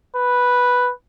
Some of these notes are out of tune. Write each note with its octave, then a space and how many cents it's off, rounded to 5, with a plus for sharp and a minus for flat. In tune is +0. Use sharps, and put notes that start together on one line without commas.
B4 -5